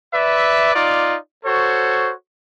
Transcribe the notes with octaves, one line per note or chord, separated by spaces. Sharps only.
B4 D5 E5
D#4 F4 D5
F#4 A4 C5 C#5